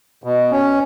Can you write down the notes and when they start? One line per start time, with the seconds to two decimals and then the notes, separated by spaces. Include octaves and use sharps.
0.24 B2
0.51 C#4